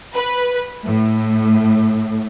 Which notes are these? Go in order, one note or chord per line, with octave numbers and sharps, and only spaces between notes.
B4
A2